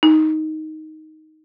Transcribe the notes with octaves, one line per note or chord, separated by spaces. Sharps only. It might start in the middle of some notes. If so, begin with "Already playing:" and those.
D#4